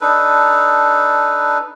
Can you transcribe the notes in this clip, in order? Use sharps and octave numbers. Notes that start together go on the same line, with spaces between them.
D4 D#4 A4 B4